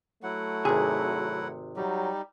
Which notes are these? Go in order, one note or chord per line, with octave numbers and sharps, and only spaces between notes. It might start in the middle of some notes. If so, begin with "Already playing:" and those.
F#3 A3 E4 F#5
G#1 C3 G#4
F#3 G3 D#4 G4